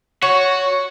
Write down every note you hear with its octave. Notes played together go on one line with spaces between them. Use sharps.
F#4 C#5